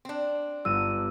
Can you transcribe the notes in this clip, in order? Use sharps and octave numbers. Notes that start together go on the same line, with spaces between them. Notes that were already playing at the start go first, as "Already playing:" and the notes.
C4 D4
G1 E6 D#7